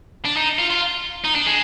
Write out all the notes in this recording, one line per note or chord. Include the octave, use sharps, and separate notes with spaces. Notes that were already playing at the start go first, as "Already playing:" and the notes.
D4
D#4
F4
F4
D#4
D4
G#3